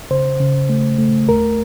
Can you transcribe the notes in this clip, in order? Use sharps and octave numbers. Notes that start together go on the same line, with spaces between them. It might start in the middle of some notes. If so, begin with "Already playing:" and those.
C#3 C5
C#3
A3
A3
D#2 A#4